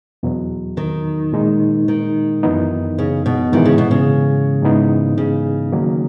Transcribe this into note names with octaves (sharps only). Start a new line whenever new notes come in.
E2 B2 F#3
D#3
A#2 G#3 D#4
D#3
F#2 E3 B3 D#4
C#3
B2
G#2 D#3 E3 G#3
C#3
B2
C#3
G#2 E3 B3 D#4
C#3
D#3 F#3 A#3